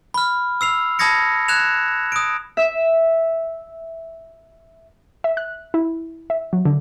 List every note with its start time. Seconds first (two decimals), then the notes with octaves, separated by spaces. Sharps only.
0.14 B5 F6
0.61 E6 C7 F7
0.99 A5 B5 D#6 G#6 A#6 C#7
1.48 F#6 G#6 E7 F7
2.12 D#6 D7
2.57 E5 E6
5.24 E5
5.37 F#6
5.74 E4
6.30 E5
6.53 F#3
6.65 D3